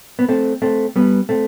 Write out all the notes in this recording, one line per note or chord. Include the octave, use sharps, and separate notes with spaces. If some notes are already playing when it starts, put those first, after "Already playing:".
B3
A3 C4
A3 C4
G3 B3
A3 C4